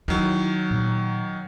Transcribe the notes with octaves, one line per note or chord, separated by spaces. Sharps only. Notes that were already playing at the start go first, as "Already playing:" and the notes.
D#3 F#3 E4
A#2